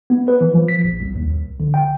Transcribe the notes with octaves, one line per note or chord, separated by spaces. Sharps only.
B3
B4
E3
F3
B6
A#1
C2
D#2
C2
D3
G5